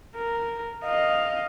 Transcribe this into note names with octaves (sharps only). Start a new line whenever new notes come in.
A#4
D#5 F5